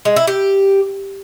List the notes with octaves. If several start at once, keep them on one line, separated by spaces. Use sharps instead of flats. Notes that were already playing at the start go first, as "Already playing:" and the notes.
G#3
E4
G4